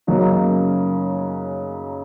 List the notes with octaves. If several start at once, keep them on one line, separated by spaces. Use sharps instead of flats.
F#2 C#3 F#3 A#3 D#4